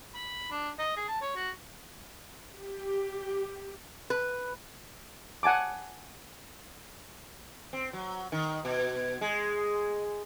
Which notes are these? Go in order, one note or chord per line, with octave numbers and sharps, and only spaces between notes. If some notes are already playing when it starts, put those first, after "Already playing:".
B5
D4
D#5
G#4
A5
C#5
F#4
G4
B4
F#5 G#5 A5 D6
C4
F#3
D#3
B2
G#3